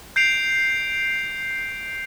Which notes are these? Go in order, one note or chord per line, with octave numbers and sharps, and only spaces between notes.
G6 C7 D7 F7